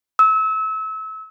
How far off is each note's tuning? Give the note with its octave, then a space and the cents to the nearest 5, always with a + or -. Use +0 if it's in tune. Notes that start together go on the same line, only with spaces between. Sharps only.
E6 -30